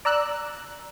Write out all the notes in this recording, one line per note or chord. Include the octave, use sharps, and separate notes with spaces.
D5 A#5 E6 F#6